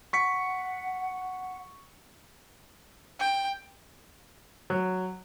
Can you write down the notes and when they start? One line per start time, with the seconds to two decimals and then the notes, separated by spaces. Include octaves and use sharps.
0.13 F#5 C#6 B6 C#7
3.20 G5
4.70 F#3